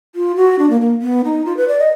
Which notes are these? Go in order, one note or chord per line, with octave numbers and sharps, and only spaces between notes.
F4
F#4
D4
A#3
A#3
B3
D#4
F4
B4
D5
D#5